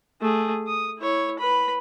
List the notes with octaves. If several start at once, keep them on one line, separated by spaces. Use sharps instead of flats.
A3 G#4
D#6
E4 C#5
B4 B5